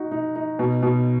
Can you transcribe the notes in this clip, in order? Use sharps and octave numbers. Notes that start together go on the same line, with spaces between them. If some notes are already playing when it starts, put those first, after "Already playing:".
Already playing: D#4 F#4
D#4
D#4
B2
B2